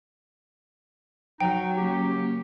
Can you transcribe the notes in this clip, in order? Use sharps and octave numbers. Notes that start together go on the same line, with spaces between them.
F#3 D#4 G5
C#3 A#3 C#4 G4